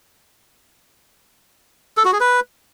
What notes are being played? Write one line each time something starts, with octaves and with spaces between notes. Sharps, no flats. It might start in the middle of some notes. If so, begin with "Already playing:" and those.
A4
F#4
G#4
B4